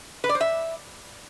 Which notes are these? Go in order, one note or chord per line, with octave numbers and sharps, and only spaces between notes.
B4
D5
C5
E5